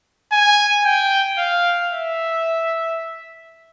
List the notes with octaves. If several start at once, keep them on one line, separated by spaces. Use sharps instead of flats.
G#5
G5
F5
E5